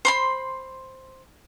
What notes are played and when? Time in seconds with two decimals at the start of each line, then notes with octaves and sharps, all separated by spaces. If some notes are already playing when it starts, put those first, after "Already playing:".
0.05 C5 B5 C6